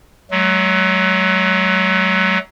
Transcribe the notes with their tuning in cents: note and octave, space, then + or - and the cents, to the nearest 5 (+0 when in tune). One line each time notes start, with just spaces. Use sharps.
F#3 +20 A3 -45